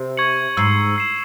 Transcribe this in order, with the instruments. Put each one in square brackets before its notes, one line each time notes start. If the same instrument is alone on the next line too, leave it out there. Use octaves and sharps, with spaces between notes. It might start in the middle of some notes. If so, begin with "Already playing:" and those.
Already playing: [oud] C3
[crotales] C#6 G#6 C#7 F#7
[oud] G#2 [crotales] E6 C7 F#7
[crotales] E6 C7 E7